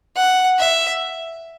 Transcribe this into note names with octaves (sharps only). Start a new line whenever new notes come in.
F#5
E5